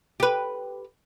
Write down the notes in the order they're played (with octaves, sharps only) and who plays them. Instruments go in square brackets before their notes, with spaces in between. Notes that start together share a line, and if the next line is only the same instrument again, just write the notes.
[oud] G4 B4